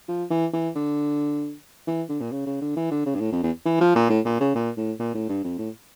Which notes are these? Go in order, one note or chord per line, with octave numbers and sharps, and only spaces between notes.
F3
E3
E3
D3
E3
D3
A#2
C#3
C#3
D3
E3
D3
C#3
G2
A2
F2
E2
E3
F3
A#2
A2
A#2
C#3
A#2
A2
A#2
A2
G2
F2
A2